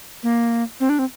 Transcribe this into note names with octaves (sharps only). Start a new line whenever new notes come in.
A#3
C4
D4
C4